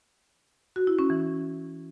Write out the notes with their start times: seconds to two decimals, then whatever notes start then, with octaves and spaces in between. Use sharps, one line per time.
0.76 F#4
0.87 E4
0.99 C#4
1.10 E3